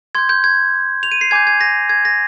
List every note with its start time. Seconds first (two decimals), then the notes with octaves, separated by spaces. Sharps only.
0.15 C6 G6 G#6
0.29 G6
0.44 G#6
1.03 F7
1.11 D#7
1.21 C7
1.31 G#5 D6 G6 G#6
1.47 G#6
1.61 A#6
1.89 G#6
2.05 A#6